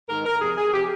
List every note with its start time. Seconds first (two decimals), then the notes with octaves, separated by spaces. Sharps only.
0.09 G#2 D#3 G#3 A#4
0.25 A#4
0.40 F2 C3 F3 G#4
0.57 G#4
0.73 C3 F3 G4